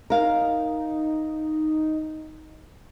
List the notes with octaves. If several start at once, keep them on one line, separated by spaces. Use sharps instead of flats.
D#4 A#4 F5